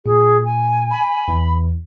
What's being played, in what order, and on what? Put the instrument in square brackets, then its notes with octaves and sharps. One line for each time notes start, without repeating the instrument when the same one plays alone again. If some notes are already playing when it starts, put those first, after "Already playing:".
[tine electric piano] A#2 [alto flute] G#4
[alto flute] G#5
[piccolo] B5
[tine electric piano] E2 E3